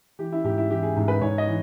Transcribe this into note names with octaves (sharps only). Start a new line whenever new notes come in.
E3 G4
E4
G#2 G4
E4
E3 G4
G#4
G#2
B4
G#2 C#5
D#5
E3